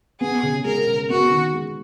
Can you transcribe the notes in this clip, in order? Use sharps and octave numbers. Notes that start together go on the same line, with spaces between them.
B3 G#4
C#3
G#3 A#4
C#3
B3 F#4
D#3
G#3